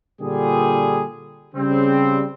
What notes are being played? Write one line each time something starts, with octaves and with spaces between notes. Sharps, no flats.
A#2 D3 G3 G#4
C#3 G3 C4